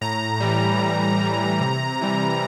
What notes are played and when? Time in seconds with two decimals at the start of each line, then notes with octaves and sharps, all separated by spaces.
0.01 A2 A#5
0.40 E3 G3
0.81 A2
1.21 E3 G3
1.61 C3
2.01 E3 G3